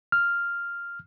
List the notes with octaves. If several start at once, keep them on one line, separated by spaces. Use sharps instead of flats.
F6